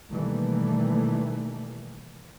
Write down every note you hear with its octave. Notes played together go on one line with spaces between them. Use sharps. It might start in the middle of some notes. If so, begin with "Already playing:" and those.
B2 D#3 E3 G3 A3 A#3